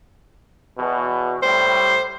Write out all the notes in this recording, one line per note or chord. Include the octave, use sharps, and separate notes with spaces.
E2 B2
A2 G3 C5